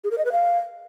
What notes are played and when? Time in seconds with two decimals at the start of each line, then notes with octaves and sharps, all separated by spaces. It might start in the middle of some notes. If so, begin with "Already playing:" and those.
0.04 G#4
0.11 A#4
0.18 D#5
0.25 B4
0.32 F5